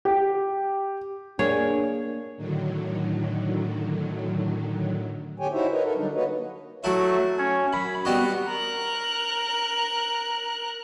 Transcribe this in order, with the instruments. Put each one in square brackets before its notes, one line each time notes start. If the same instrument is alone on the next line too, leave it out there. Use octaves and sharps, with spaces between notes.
[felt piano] G4
[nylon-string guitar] A#3 [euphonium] D4 [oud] G#4 [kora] C#5
[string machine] A2 D3 D#3 F#3
[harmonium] E2 D3 G4 C#5 G5 G#5
D#4 E4 F#4 C5 C#5 E5
A#4 B4 C#5 D#5
A4 A#4
D3 F#3 G3 D4 D#4
A#3 F#4 B4 C#5 D#5
[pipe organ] F#3 A3 [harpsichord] E4 F#4
[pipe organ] C#4 C#5
[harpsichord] F#2 [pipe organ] B5
[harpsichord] G3 C4 D#4 [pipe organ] B3 F#4
[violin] A#4 F#6